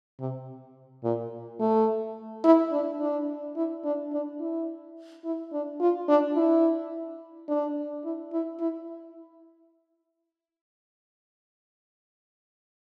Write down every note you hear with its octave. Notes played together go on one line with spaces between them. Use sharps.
C3
A#2
A3
E4
D4
D4
E4
D4
D4
E4
E4
D4
F4
D4
E4
D4
E4
E4
E4